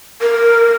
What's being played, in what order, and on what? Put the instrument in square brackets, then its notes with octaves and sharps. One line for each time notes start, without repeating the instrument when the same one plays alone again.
[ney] A#4